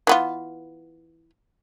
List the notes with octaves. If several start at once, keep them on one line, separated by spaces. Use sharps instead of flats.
E3 B3 F4